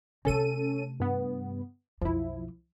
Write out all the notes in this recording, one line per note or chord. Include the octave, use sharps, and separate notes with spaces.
C3 A3 C#4 A4 D#7
G2 B3
B1 F2 F3 E4